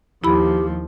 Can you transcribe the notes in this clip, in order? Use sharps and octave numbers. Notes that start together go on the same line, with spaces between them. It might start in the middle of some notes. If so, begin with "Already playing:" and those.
D#2 F3 E4 G4 B5